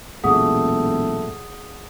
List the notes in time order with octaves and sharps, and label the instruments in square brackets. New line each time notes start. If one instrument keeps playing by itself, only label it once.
[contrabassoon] E1 [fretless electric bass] B1 F#2 A#2 [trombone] A3 [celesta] G#4 F#5 D#6